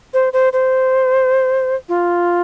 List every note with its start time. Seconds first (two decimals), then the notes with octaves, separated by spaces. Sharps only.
0.14 C5
0.33 C5
0.53 C5
1.89 F4